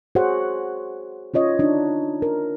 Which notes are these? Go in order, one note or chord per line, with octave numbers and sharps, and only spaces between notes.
F#4 G#4 C5 C#5 F#5
C#4 F4 C#5 D#5
D4 D#4
A#4